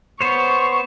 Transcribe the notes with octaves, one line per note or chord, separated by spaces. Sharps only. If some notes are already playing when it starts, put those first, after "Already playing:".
B3 C5 C#5 C#6